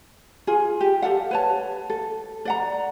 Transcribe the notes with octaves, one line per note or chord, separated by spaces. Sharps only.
F4 G#4
G4
G4 A4 F5 F#5
B4 C#5 A5
A4
D5 F#5 A#5